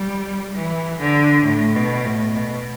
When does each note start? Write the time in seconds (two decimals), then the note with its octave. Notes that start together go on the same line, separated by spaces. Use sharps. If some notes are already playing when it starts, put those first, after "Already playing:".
Already playing: G3
0.55 E3
1.00 D3
1.45 A2
1.76 B2
2.05 A2
2.35 B2